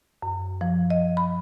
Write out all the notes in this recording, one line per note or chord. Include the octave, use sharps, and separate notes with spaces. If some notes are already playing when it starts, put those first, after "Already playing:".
F#2
F3
D#5
B5